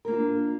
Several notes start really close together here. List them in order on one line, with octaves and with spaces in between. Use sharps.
A#4 A#3 F4 D4